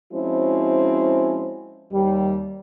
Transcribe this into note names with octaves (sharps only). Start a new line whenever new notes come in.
F3 G#3 C4 C#4 E4 F#4
D#2 G3